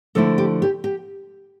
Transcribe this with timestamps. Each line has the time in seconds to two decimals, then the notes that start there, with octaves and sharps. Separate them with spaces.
0.15 D3 F3 A3 E4 A4
0.38 G4
0.62 G4
0.84 G4